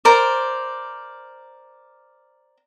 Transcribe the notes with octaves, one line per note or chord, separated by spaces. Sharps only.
A#4 C5 D5